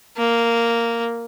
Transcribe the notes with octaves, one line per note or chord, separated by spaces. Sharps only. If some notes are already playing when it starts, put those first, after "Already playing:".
A#3